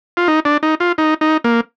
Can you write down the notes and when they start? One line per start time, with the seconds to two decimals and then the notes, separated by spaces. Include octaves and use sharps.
0.17 F4
0.28 D#4
0.45 D4
0.63 D#4
0.80 F4
0.98 D#4
1.21 D#4
1.44 A#3